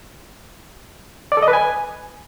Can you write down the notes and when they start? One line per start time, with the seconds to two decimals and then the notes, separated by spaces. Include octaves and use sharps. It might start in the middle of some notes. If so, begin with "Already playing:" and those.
1.32 D5
1.37 A4
1.42 D#5
1.48 B4
1.53 G#5